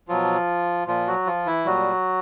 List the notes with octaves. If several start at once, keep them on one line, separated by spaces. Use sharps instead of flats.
B2 F3 F#3 F4
A#2 F3 F4
F#3 F#4
F3 F4
E3 E4
A#2 F#3 G3 F#4